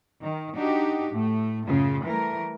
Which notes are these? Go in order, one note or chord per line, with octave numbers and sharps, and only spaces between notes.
D#3
D4 D#4 F#4 G4
A2 A3
F#2 A2 C#3 F4
E3 G3 A3 A#4